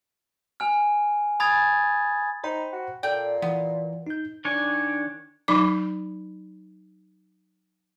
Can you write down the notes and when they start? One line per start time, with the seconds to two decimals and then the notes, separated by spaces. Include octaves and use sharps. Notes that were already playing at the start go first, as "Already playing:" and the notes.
0.60 G#5 F6
1.40 G#5 B5 D#6 G#6 A6
2.44 D#4 C5 G5 B5
2.73 F#4
3.03 A#2 A4 D5 G5
3.42 E3 B3
4.07 D#4 G6
4.45 D#3 D4 C#5 G#5
5.48 F#3 D#4 B5 D6